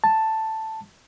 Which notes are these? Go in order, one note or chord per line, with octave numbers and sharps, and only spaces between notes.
A5